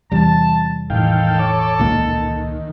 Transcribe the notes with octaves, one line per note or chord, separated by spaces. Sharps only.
E2 C3 G3 A5
E1 A2 D#3 E3 A4 F5 G5
C#5 D6
C#2 A#2 D#3 A#3